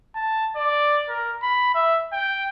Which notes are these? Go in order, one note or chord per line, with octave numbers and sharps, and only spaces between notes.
A5
D5
A#4
B5
E5
G5